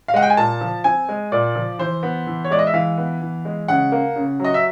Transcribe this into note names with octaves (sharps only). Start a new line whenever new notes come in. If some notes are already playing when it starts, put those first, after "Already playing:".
F5
G#3 F#5
G5
G#5
A#2 A5
F3
C4 G#5
G#3
A#2 D5
F3
E3 C5
B3
E3
C#5
G#3 D5
D#5
E5
E3 F5
B3
E3
G#3
C#3 F#5
A#3
C#3
F#3 D#5
E5